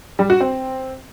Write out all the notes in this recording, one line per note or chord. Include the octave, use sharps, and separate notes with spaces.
G3
F#4
C4